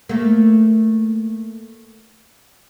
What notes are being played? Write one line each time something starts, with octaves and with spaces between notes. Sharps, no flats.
A3 A#3